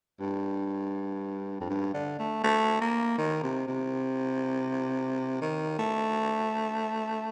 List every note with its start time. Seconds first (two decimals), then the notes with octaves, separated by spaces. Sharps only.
0.20 G2
1.60 F2
1.70 G2
1.94 D3
2.19 A3
2.44 A3
2.81 A#3
3.18 D#3
3.43 C3
3.68 C3
5.42 D#3
5.79 A3